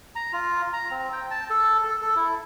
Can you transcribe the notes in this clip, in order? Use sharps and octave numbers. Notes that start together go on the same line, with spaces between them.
A#5
F4
A#5
C4
G5
A5
A4
A4
A4
E4